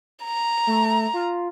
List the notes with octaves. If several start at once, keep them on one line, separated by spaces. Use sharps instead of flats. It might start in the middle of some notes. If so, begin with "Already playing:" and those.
A#5
A3
F4